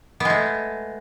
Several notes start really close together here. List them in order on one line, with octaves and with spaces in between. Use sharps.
B3 G#3 A3